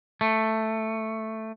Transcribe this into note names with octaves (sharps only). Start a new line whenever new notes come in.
A3